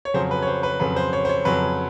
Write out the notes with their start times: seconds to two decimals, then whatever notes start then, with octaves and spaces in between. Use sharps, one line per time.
0.05 C#5
0.14 F2 C#3 F#3 C5
0.31 B4
0.42 C#5
0.47 C5
0.63 B4
0.80 F2 C#3 F#3 B4
0.96 C5
1.13 C#5
1.25 C5
1.29 C#5
1.45 F2 C#3 F#3 B4